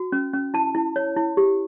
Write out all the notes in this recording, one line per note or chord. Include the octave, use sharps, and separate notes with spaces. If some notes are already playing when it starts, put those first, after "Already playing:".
Already playing: F#4
C#4
C#4
E4 A5
E4
C#5
E4
G4